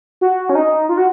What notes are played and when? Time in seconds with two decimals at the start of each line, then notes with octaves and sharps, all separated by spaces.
0.21 F#4
0.49 C#4
0.55 D#4
0.89 F4
0.97 F#4